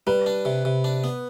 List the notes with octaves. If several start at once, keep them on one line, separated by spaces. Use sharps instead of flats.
G3 B4
D4
C3
C3
D4
B3